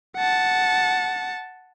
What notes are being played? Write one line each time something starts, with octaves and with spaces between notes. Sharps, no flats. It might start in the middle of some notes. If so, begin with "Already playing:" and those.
F#5 A5